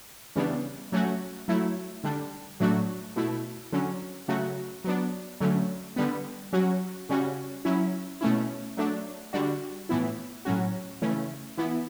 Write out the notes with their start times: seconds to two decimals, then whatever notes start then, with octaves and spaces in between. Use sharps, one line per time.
0.36 C#3 E3 G3 B3 D4
0.92 F#3 A3 C#4 F#4
1.48 F#3 A3 E4
2.04 D3 G3 D4
2.60 A2 F#3 A3 D4 F#4
3.16 B2 A3 E4
3.72 D3 F#3 C#4
4.28 C#3 F#3 A3 C#4 F#4
4.84 F#3 B3 D4
5.41 D3 F#3 A3 C#4
5.96 D3 G3 B3
6.53 F#3 C#4 F#4
7.09 C#3 G3 C#4 F#4
7.65 F#3 C#4 E4
8.21 B2 A3 C#4 E4
8.77 F#3 A3 D4
9.33 D3 G3 D4 F#4
9.89 A2 E3 B3 E4
10.45 A2 F#3 C#4 F#4
11.02 C#3 E3 A3 C#4
11.57 E3 B3 E4